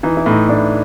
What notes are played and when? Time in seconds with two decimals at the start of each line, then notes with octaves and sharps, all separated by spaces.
0.03 E3 D#4
0.17 E4
0.26 A2 D#4
0.49 A2 D4